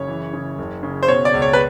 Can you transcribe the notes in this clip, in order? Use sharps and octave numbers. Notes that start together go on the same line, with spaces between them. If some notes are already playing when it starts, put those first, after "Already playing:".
Already playing: F#1 C#3 C#5
E3
C#3
F#1
C#3
C5
B2 C#5
D5
C#2
C#5
B4